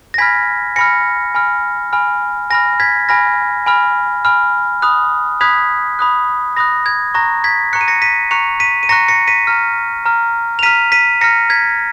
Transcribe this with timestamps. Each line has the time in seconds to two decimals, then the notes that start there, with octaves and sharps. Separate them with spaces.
0.14 A#6
0.18 G#5 B5 F6 G#6 B6
0.76 G#5 B5 F6 A#6 C#7
1.35 G#5 B5 F6
1.93 G#5 B5 F6
2.50 G#5 B5 F6 A#6
2.80 G#6 B6
3.09 G#5 B5 F6 A#6
3.66 G#5 B5 F6
4.25 G#5 B5 F6
4.82 B5 D#6 F#6
5.41 B5 D#6 F#6 G#6 B6
5.99 B5 D#6 F#6
6.57 B5 D#6 F#6 A#6
6.86 G#6
7.14 A#5 C#6 F#6 A#6
7.44 G#6 B6
7.73 A#5 C#6 F#6 C#7
7.81 D#7
7.88 A#6 C#7
8.02 B6 D#7
8.31 A#5 C#6 F#6 C#7 F7
8.60 B6 D#7
8.83 D#7
8.89 A#5 C#6 F#6 A#6 C#7
9.08 A#6 C#7
9.28 B6 D#7
9.47 A#5 F6
10.05 A#5 F6
10.59 F7
10.63 A#5 F6 B6 D#7
10.92 B6 D#7
11.21 A#5 F6 A#6 C#7
11.50 G#6 B6